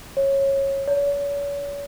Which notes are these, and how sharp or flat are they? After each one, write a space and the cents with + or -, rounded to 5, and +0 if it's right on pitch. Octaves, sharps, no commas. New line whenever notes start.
C#5 -15
C#5 +40